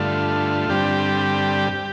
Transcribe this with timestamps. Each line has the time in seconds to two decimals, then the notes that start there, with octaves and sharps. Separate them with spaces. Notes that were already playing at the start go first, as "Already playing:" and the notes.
Already playing: G2 D3 A3 F4
0.69 G2 D3 G3 C4 G4